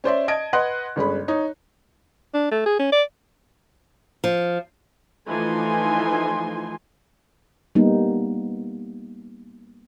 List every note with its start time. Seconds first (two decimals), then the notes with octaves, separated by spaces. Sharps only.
0.04 C#4 C5 D5 E5
0.28 D#5 A5 G#6 D7
0.53 B4 D#5 F#5 C6 F#6
0.96 G1 G#3 C#4 B5
1.28 D#4 C#5
2.34 D4
2.51 A3
2.66 G#4
2.79 C#4
2.92 D5
4.24 F3
5.26 E3 F3 A3 D#4 G#5 C6
7.75 G3 A#3 B3 D#4